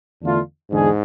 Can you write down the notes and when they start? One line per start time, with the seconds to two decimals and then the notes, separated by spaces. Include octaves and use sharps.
0.22 E2 D3 A3 D4 F4
0.71 E2 G#2 D3 G#3 D4 G#4